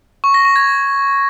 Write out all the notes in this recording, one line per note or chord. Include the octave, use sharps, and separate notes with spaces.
C#6
A#6
C#6
G#6